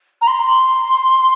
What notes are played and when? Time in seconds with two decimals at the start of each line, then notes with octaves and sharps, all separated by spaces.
0.21 A#5
0.27 C6